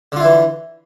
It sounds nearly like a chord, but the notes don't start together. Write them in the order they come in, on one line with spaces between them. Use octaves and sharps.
D3 F4 E4 E3